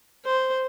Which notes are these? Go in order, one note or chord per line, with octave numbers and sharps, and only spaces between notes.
C5